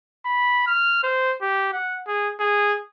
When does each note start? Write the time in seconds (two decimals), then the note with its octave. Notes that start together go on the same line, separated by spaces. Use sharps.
0.26 B5
0.67 F6
1.04 C5
1.42 G4
1.73 F#5
2.07 G#4
2.40 G#4